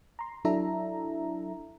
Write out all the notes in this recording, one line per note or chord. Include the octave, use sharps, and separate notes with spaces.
A#5 C6
F#3 D4 E4 A4 E5 A#5